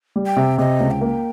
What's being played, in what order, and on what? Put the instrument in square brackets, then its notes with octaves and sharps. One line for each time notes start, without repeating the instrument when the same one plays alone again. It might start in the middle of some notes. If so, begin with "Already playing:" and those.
[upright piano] G3
[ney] G5
[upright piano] C3
[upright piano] C3 [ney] D#5
[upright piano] C#2
[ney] G5
[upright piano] A#3